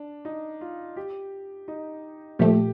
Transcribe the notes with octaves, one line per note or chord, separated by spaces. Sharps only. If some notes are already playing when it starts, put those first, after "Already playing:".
Already playing: D4
D#4
F4
G4
D#4
A#2 F3 A3 G4